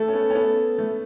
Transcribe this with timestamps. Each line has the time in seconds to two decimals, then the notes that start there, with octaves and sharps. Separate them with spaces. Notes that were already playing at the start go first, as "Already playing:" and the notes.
Already playing: A3 A4
0.08 C#4
0.13 B3
0.30 C#4
0.35 B3
0.78 A3